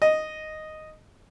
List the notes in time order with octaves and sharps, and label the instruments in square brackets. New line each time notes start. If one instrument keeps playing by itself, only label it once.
[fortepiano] D#5